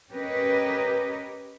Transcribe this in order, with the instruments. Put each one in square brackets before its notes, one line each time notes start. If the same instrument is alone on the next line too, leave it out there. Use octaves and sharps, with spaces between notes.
[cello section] C#4 G4 A#4 B4 D#5